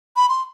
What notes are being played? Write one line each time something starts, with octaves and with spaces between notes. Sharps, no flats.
B5
C6